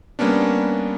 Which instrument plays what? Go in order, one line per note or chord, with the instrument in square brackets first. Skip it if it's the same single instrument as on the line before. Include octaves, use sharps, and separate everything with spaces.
[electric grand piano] G3 A#3 B3 C#4 D4